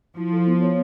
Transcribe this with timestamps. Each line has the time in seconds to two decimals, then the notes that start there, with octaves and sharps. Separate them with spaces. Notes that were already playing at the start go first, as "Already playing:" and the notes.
0.17 F3 E4
0.32 A4
0.47 B3
0.62 C#5